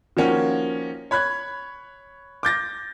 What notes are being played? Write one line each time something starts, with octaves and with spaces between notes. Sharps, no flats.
D#3 F3 A#3 C#4 F#4 C#5
C#5 B5 F#6 G#6
D6 G6 A6 A#6